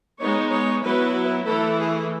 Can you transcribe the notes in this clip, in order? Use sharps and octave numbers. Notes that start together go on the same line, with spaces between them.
G#3 B3 D#4 C#5
C#5
F#3 B3 E4 B4
E3 A3 E4 A4
G#4